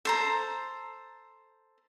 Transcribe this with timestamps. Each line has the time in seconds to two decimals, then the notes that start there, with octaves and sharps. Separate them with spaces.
0.05 A4 C5 A#5